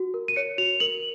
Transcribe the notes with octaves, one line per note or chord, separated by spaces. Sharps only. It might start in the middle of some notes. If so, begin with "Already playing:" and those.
Already playing: F#4
A#4
D#7
C#5 C#7
F#4 F7
A#4 F#7